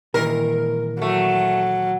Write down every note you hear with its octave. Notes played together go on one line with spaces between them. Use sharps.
A#2 D#3 E3 A#4
F#3 A3